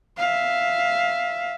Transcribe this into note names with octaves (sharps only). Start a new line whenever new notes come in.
E5 F5